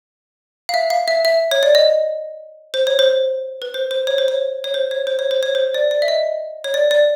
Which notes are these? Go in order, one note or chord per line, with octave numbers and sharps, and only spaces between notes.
F5
E5
F5
E5
E5
C#5
D5
D#5
C5
C#5
C5
B4
C5
C5
C#5
C5
C#5
C#5
C5
C#5
C5
C#5
C5
C#5
C5
D5
D5
E5
D#5
C#5
D5
D5